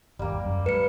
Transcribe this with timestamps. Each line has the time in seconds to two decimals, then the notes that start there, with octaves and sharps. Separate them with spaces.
0.19 G1 D#2 G3 A#3
0.45 F#2
0.66 G#2 B4 C#7